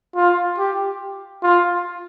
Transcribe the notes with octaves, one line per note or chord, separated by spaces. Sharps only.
F4
G4
F4